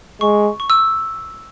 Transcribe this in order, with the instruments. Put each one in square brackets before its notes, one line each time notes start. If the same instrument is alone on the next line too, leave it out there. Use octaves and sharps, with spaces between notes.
[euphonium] G#3 [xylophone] C#6
[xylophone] C#6
E6